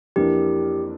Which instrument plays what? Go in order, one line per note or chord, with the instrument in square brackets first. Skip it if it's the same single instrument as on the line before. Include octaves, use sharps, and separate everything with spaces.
[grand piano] F2 E3 A#3 D4 [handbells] G4